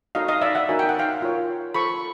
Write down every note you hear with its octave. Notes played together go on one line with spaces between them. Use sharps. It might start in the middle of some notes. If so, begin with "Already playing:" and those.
D#4 F#4 A4 C#5 D#5 F5
D#5 F5
D5 E5
E5 F#5
D#4 F#4 A#4 C#5 G#5
G5
F#5
F5 G5
F4 A#4 C#5
F4 A4 C5 B5 C#6